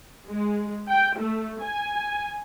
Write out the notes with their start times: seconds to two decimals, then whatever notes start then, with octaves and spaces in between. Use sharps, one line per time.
0.26 G#3
0.90 G5
1.19 A3
1.63 G#5